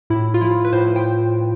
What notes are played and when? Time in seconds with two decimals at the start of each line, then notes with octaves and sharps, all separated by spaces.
0.10 A2 E4
0.34 F4
0.41 F3 E4
0.65 B4
0.72 A2 C5
0.88 C5
0.96 G5